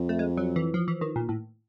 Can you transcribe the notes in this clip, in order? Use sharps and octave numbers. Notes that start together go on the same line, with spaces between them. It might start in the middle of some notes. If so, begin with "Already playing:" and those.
Already playing: F2
A3
G#3
F#3
E3
F3
E3
D#3
A#2
A2